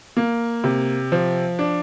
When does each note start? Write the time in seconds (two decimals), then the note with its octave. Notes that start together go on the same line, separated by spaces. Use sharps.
0.17 A#3
0.64 C3
1.12 F3
1.59 D4